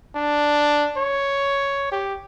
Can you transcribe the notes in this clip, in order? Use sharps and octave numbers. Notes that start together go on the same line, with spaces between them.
D4
C#5
G4